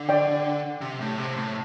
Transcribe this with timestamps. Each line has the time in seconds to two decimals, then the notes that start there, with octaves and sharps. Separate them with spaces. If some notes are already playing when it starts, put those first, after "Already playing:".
Already playing: D3
0.09 D5 G5
0.81 C3
1.01 A2
1.18 C3
1.36 A2